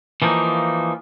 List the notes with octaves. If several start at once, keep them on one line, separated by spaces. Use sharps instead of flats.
E3 F3 A#3 D4 D#4